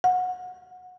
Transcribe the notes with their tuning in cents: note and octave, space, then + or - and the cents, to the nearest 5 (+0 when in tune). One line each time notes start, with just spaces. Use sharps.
F#5 -20